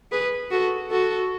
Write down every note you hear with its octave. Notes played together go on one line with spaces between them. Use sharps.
G#4 B4
F#4 A4
F#4 A4